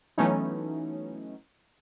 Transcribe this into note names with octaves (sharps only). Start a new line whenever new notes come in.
E3 F#3 A3 B3 C#4 D#4